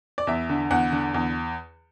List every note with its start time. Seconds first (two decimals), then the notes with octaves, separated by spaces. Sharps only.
0.18 D5
0.27 E2 E5
0.49 D3
0.71 E2 F#5
0.92 D3
1.14 E2